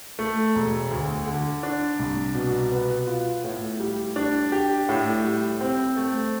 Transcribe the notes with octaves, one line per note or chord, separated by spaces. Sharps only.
A3
E1
D2
D3
D4
C2
B2
B3
F4
A2
G3
D4
G4
A2
G3
C4
A3